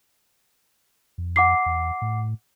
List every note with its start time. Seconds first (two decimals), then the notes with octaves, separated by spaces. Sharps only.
1.18 F2
1.36 F#5 D6 C7
1.66 E2
2.02 A2